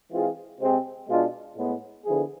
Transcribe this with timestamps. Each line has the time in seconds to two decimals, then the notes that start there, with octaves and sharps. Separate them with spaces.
0.11 E3 G#3 C4 F4 G#4
0.60 C3 G#3 C4 G#4
1.08 B2 G#3 D4 F4
1.57 A2 G#3 B3
2.05 D3 F3 B3 E4 G#4